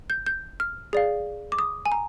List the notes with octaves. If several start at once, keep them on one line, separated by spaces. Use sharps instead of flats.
G6
G6
F6
G#4 D5 F5
D6
D#6
G#5
A#5